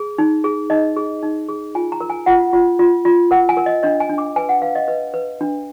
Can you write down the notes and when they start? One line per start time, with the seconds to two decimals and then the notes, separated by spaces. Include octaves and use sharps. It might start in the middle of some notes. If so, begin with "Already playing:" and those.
Already playing: G#4
0.18 D#4
0.44 G#4
0.70 D#4 D#5
0.97 G#4
1.23 D#4
1.49 G#4
1.75 F4 G#5
1.92 A#5
2.01 A#4
2.10 G#5
2.26 F4 F#5
2.53 F4
2.79 F4
3.05 F4
3.31 A#4 F#5
3.49 G#5
3.57 A#4
3.66 D#5
3.83 D4 D#5
4.00 G#5
4.09 D4
4.18 D6
4.36 B4 G#5
4.49 F#5
4.62 B4 F5
4.75 D#5
4.88 B4 D#5
5.14 B4
5.41 D4